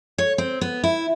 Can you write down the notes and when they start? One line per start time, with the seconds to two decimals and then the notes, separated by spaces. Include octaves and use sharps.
0.18 C#5
0.38 C4
0.61 B3
0.84 E4